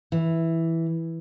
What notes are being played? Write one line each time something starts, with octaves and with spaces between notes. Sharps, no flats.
E3